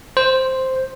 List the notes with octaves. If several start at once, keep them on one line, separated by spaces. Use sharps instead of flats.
C5